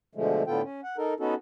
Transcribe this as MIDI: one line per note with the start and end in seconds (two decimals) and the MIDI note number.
0.15 0.43 47
0.15 0.43 50
0.15 0.43 53
0.15 0.43 56
0.15 0.43 57
0.47 0.62 45
0.47 0.62 50
0.47 0.62 59
0.47 0.62 65
0.47 0.62 69
0.47 0.62 79
0.63 0.81 61
0.83 0.97 78
0.98 1.14 63
0.98 1.14 69
0.98 1.14 70
1.20 1.34 59
1.20 1.34 61
1.20 1.34 63
1.20 1.34 66
1.20 1.34 69